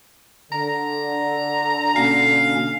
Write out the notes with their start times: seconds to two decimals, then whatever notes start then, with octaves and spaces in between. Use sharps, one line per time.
0.52 D3 A#5
1.96 B2 A#3 C#4 F5